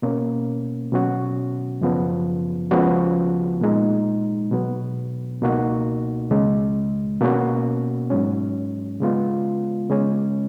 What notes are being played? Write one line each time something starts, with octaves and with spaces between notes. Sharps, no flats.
B2 A#3 C#4
B2 F#3 C#4 F#4
F#2 C#3 F3 B3
C#2 C#3 F3 B3 F#4
A#2 G#3 D#4
B2 F#3 B3
C#2 B2 A#3 D#4 F#4
C#2 C#3 G#3
B2 A#3 C#4 F#4
G#2 F#3 C#4
C#3 G#3 B3 F4
C#3 G#3 C#4